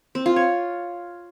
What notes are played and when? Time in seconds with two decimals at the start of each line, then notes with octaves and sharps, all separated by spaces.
0.15 C4
0.26 F4
0.36 C#5